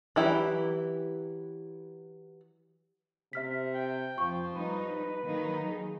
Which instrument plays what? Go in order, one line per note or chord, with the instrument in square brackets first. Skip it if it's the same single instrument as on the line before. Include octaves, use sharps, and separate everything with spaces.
[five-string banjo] E3 F#3 E4 G4
[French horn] C3 [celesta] E5 F6 B6
[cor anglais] G5
[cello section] F2 [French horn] F3 [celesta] C#6
[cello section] G3 D#4 [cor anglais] B4
[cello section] D#3 F#3 D#4 [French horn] A#3
[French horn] G#4